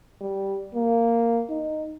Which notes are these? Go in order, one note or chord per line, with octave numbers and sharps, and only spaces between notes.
G3
A#3
D#4